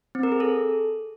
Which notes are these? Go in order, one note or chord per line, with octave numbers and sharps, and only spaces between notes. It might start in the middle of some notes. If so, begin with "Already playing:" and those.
C4
A#4
G#4
A4